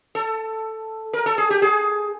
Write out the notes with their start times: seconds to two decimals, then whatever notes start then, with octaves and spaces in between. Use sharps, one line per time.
0.15 A4
1.13 A#4
1.26 A4
1.38 G#4
1.50 G4
1.62 G#4